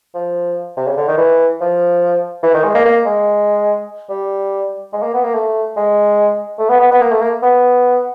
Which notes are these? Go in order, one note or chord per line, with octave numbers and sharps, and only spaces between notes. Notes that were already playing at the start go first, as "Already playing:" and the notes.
F3
C3
C#3
D3
D#3
E3
F3
E3
D#3
G#3
A#3
A#3
G#3
G3
G#3
A#3
B3
A#3
A3
G#3
A3
B3
B3
B3
A#3
A3
A#3
B3